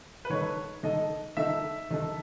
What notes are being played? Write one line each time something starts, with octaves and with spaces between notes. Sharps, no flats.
B4
D#3 G#3 D#4 A4 C#5
D#3 G#3 D#4 A4 D#5
D#3 G#3 D#4 A4 E5
D#3 G#3 D#4 A4